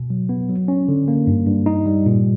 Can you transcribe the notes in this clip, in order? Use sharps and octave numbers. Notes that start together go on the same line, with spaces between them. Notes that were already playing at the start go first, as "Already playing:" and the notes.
Already playing: B2
F#3
B3
F#3
C#4
D3
A#3
G2
G2
D#4
G3
A#2